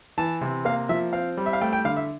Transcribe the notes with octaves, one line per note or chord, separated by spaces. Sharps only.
E3 A5
C3
A#3 F5
F3 E5
C4 F5
G3
E5
F5
A3 G5
G5
D3 F5
E5